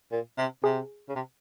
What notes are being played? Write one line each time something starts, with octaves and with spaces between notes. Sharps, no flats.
A#2
C3
C3 G#4
C#3
C3